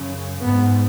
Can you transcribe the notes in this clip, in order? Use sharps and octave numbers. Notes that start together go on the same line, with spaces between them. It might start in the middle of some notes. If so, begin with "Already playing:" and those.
Already playing: F#2 C#3
G#2 B3